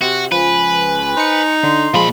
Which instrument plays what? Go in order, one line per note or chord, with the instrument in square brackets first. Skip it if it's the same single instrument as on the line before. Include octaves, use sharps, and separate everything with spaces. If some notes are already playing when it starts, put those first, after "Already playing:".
[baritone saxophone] C3 [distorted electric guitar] F#4
[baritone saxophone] C#2 [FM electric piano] F3 [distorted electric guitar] B4 [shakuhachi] G#5
[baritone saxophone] D#4 [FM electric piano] C5 C#7
[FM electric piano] D3 [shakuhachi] C6
[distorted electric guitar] A#2 B5 [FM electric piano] F3 G#3